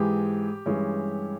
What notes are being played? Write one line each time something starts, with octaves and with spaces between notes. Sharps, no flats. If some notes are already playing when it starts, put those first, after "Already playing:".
Already playing: G#2 E3 G#3 G4
G2 E3 G#3 C#4